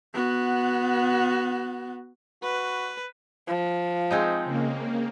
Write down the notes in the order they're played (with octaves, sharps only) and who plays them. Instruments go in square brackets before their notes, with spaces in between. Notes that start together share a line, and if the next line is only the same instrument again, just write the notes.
[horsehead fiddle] B3 F#4
[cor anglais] F#4 [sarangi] B4
[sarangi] F3
[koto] G#3 C4 D#4
[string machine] C#3 A#3